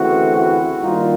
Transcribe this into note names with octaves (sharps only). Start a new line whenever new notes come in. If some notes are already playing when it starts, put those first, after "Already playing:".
Already playing: D2 C#3 E3 A3 C4 E4 F#4
E4 F#4
G2 D#3 G3 A#3 D#4 F4